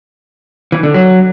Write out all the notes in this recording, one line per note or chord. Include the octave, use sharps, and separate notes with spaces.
E3
D3
F#3